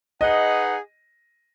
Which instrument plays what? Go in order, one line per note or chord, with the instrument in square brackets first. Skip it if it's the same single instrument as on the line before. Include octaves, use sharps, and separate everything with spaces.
[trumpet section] D#4 G#4 B4 F#5 [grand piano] D#5